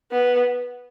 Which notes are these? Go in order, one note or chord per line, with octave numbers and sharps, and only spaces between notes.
B3